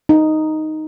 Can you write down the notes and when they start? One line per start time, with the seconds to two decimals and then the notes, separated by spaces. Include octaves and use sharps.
0.09 D#4